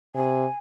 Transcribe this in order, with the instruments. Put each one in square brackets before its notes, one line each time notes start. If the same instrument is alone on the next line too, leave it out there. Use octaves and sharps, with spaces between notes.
[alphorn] C3 [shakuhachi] G#5